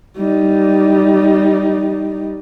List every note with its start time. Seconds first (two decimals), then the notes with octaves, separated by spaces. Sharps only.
0.17 G3 D#4